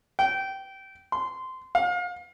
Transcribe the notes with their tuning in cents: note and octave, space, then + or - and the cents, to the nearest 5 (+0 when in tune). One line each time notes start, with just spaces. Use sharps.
G5 -20
C6 -15
F5 +35